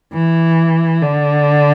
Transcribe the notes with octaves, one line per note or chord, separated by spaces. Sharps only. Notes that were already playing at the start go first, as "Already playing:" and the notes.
E3
D3